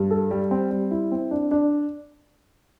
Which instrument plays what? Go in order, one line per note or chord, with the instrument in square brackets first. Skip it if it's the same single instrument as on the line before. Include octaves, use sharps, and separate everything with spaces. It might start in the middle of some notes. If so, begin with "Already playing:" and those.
Already playing: [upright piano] G2
A4
G3
C4
G3
E4
C4
D4
D4